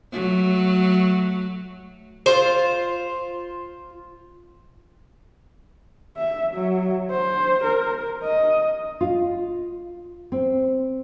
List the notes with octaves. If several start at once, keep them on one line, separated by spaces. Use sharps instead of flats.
F#3 A3
F4 C5
E5
F#3
C5
A#4
D#5
F4
C4